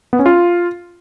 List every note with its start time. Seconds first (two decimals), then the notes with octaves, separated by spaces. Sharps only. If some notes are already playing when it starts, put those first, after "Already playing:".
0.13 B3
0.19 C#4
0.26 F4